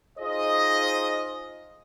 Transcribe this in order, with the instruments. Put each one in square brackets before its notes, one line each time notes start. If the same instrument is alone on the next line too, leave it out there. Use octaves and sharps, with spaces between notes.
[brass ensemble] D#4 F4 G#4 C5 D#5